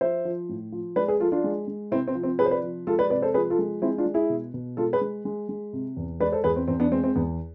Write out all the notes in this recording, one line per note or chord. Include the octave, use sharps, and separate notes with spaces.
F3 C5 E5
F3
A2
F3
G#3 B4 D5
G#4 B4
F3 F4 A4
D4 F4
G#3
G#3
C3 C4 E4
C4
F3
C4
C3 G#4 B4
C5
B4 D5
F3
G#3 F4 A4
B4 D5
C3 B4 D5
A4 C5
F3 G#4 B4
F4 A4
G#3
G#3 C4 E4
D4 F4
G#3
E4 G#4
B2
B2
G#3 F4 A4
G#4 B4
G#3
G#3
G#3
C3
E2
G#3 B4 D5
A4 C5
E2 G#4 B4
C4
E2 C4
B3 D4
G#3 C4
C4
E2 B3